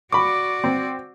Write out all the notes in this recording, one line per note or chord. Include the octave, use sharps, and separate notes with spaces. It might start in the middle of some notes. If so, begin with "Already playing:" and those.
F#4 D5 B5 C#6 D6
C4